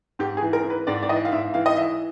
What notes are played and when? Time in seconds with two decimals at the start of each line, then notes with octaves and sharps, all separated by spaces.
0.19 G#2 G4
0.37 G#4
0.42 E3
0.53 A#4
0.64 E3
0.70 B4
0.87 G#2 D5
1.03 D5
1.09 E3 D#5
1.25 F5
1.32 G#2 E5
1.54 E3 F5
1.66 D#5
1.77 E3 E5